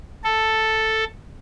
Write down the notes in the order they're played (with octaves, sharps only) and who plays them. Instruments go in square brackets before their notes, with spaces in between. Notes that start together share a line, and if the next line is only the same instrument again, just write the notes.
[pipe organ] A4